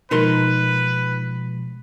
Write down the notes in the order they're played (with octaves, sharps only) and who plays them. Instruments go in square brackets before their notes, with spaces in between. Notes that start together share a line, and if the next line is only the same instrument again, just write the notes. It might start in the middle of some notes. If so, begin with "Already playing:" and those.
[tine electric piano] B2 F3 G#3 [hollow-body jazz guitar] D#4 A#4 C6 [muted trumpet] B4